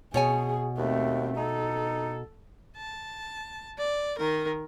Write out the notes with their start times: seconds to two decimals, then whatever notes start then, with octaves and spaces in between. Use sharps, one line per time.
0.14 B2 G#4 C#5 G#5
0.78 D#2 A3 C4
1.37 D#4 A4
2.77 A5
3.78 D5
4.18 D#3 A#4